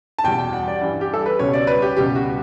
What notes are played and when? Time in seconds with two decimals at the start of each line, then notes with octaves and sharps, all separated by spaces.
0.18 A5
0.24 E2 B2 G3 G5
0.38 G5
0.53 F#5
0.68 D5
0.81 G2 E3 G3
1.01 G4
1.14 A4
1.26 B4
1.39 C#2 B2 G3 C#5
1.53 D5
1.67 B4
1.82 G4
1.97 C#2 B2 G3 G4
2.15 F#4